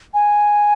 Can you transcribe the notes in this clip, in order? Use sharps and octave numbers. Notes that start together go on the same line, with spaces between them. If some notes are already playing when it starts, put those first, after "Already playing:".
G#5